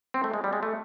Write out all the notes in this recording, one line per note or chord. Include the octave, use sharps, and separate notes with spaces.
C4
A3
G#3
G3
G#3
A3